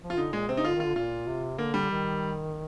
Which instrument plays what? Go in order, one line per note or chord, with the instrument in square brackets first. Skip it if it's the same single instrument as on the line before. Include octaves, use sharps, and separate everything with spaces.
[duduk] F3
[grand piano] F4
[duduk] D3 [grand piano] D#4
[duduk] A#2 [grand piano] G#3
[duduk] C3 [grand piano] C4
[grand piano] D#4
[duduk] D3 [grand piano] F4
[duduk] D#3 [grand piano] F4
[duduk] D3
[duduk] A#2 [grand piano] F4
[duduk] C3
[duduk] D3 [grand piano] A#3
[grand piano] G3
[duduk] D#3